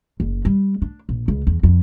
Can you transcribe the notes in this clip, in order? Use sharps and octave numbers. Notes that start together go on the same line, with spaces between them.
F#1
G3
D4
A#1
C#2
E2
F2